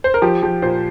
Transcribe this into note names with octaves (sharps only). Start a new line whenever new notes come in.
C5
A#4
F3 G4
F3 G4
A#2 C5